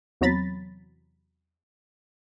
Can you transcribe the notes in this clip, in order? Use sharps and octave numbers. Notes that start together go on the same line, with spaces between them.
E2 C3 F#3 A#5 B5 A6